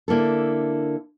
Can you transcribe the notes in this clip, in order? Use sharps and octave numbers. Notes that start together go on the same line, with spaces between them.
D3 A#3 E4 A4